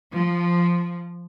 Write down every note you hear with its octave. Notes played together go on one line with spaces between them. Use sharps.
F3